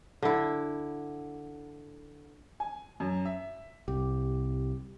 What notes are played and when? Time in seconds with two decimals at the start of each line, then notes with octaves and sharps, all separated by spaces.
0.22 D3 E4
2.60 G#5
3.00 F#2
3.25 E5
3.88 C2 G4